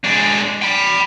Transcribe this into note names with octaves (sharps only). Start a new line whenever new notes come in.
G#3 D4
G5 B5